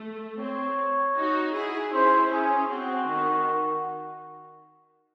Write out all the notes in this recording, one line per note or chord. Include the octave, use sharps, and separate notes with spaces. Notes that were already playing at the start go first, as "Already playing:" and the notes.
Already playing: A3
C4 C#5
D#4 F#4
E4 G#4
C#4 E4 C5
C#4 G#4
C4 F#4
D#3